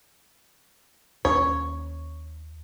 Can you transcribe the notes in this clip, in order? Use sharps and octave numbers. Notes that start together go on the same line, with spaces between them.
D#2 C#4 C#5